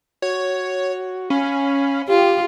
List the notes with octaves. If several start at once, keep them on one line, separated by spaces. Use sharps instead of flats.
F#4 C#5
C#4 C#5 F5 B5
F4 G4